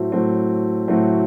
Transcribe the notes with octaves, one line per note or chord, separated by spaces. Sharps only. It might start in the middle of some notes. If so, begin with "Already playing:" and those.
Already playing: A2 F#3 A3 C4 F#4
A2 F#3 A3 C4 F#4
A2 F#3 A3 C4 F#4